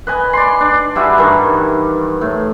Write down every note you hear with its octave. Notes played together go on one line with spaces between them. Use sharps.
B4 D#5 G#5
D5 C6
D4
G3 E4 F#4 G#4
G2 D#3 E3
A2